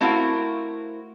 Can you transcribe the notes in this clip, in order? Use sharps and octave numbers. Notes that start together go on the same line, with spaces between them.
A3 C4 E4 F#4 A#4 F5